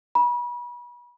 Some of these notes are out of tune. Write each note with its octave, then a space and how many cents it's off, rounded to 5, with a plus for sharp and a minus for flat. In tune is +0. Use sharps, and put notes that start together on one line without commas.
B5 -35